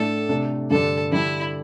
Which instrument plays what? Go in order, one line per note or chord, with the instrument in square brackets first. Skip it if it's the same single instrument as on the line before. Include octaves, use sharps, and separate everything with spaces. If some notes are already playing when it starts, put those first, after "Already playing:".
Already playing: [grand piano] A2 A3 D4 [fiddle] A4
[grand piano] C3 A3 D4
[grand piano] G2 D3 G3 D4 [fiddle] A4
[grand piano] D3 G3 D4 [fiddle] E4